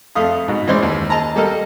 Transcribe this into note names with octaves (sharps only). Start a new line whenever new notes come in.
F2 A3 F5 D#6
G#2 B2
E3 G#3 C#4 C5 D5
D#2
D#5 A5 A#5
G3 A#3 A4 A#4 D#5